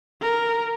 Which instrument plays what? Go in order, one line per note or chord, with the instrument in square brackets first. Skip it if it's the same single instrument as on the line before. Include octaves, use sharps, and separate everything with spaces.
[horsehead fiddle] A#4